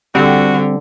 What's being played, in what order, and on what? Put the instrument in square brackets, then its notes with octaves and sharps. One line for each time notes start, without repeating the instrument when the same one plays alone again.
[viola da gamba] D3 [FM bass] G3 [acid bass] C4 [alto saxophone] F#4